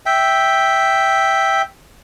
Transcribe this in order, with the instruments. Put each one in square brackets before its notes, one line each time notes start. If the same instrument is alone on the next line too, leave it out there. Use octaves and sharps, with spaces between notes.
[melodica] E5 G5